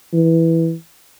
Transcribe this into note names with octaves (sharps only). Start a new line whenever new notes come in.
E3